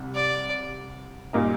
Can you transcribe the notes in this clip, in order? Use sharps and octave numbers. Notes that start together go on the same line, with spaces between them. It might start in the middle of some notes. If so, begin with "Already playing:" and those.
Already playing: C2 C3 G3
D5
A#2 G3 A#3 D#4